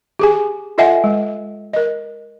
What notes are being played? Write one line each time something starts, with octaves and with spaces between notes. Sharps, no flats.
G4 G#4 G#5
F4 A4 D#5 E5 F#5 G#5
G#3
A#4 D#5